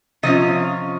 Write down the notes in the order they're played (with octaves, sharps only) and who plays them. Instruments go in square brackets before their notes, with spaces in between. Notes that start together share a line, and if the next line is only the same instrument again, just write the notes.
[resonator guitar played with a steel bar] C3 F3 C#4 F4 D#5